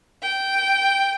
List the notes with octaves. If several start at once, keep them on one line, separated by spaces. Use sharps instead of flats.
G5